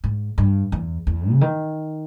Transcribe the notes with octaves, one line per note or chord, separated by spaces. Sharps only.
G#2
G2
E2
E2
C#3
D#3